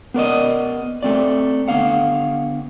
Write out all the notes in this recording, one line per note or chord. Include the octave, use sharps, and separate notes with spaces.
B3 A#4 D5 D#5
A3 C4 D5
D3 B3 F5 F#5